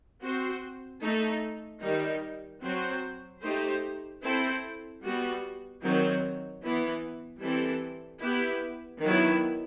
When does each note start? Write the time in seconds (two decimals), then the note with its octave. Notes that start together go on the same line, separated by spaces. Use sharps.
0.23 C4 F#4 C5
1.02 A3 D#4 A4
1.83 D#3 G3 D#4
2.62 F#3 C4 F#4 C5
3.42 A3 D#4 G4 C5
4.22 C4 E4 A4 C5
5.02 G3 B3 F#4
5.82 D#3 F#3 C4
6.62 E3 B3 E4
7.41 E3 G3 C4 E4 A4
8.21 B3 E4 G4 B4
9.01 D#3 F#3 B3 E4